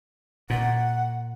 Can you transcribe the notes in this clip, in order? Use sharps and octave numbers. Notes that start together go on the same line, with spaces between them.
A#2 F#5